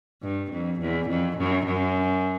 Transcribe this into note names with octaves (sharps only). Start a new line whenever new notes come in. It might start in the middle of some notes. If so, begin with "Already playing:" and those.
G2
F2
E2
F2
F#2
F#2